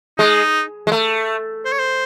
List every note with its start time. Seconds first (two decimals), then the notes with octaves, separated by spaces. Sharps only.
0.18 G#3 D#4
0.87 G#3
0.92 A3
1.65 C5
1.72 C#5
1.79 C5